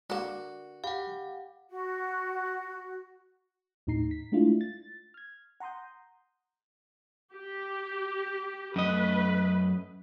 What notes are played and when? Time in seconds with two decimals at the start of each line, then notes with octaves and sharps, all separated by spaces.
0.10 D3 A#3 F#4
0.84 G4 F5 F#5 B5
1.70 F#4
3.87 D#2 A2 D#4 A#5 C7
4.11 B6
4.32 G#3 A3 D4 E4 F4
4.61 A6
5.14 F6 G#6
5.60 F#5 A#5 C6 D#6 G6
7.33 G4
8.76 F#2 A3 B4 D#5